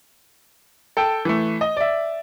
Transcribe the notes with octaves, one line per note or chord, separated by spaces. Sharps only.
A4 G5
E3 A3
D#5
D5 E5